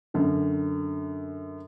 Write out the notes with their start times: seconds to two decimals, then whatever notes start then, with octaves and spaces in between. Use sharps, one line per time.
0.14 F#2 D3